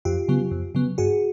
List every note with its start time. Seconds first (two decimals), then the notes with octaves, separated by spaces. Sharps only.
0.05 F2 F4 G4
0.28 C#3 F#3 B3
0.51 F2
0.75 C#3 F#3 B3
0.98 G2 F#4 G#4